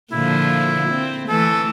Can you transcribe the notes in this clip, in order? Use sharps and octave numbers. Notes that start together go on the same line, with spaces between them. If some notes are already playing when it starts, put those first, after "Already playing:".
A#2 D3 F3 E4
C4
E3 A3 A4